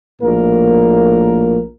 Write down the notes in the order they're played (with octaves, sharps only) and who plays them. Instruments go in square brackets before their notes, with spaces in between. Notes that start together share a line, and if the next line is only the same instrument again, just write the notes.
[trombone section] A#1 A2 A#3 A#4